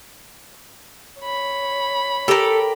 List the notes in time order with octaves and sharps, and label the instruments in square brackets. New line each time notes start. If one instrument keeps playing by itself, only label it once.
[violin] C#5 B5
[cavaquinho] G4 A#4 [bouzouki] A4